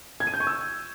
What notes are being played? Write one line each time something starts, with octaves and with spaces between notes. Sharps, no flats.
G#6
D#7
G6
C#6
E6